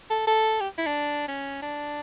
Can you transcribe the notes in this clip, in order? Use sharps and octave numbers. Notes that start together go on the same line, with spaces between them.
A4
A4
G4
E4
D4
C#4
D4